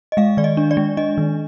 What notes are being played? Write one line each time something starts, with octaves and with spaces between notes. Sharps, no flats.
D#5
G#3 F5
D#3 D5
D#5
D4
D5
G#3
D4 D#5
D#3